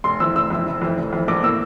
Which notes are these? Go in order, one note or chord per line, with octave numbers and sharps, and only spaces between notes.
F1 C6
F2 E3 E6
F1 E6
F2 E3
F1
F2 E3
F1
F2 E3
A#1 D6
A2 E3 A#3 E6